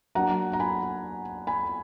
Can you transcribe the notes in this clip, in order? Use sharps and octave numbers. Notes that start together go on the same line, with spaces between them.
F#3 A#3 D4 F#5 A#5
A#5
G#5 B5
G#5 B5